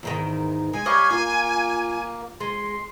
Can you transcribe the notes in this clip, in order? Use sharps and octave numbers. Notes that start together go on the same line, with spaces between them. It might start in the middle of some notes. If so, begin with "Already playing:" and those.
E2 G#2 D#3
G#3 G#5
G3 G4 C#5 D#5 F5
A#3 F4
G#3 C6